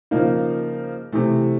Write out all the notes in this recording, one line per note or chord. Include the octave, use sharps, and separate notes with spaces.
C#3 F3 A#3 D#4
C3 E3 A3